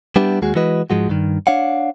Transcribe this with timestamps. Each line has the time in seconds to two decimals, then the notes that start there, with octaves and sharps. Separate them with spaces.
0.16 G3 B3 D4 E4 G4
0.42 D#2 G#3 F#4 G#4
0.55 E3 G#3 E4 F#4 B4 D#5
0.90 G#2 F3 G#3 F#4
1.09 G2 D#3
1.47 D4 C#5 F5 F#5